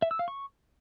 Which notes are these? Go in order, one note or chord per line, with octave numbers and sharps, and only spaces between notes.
E5
E6
F5
C#6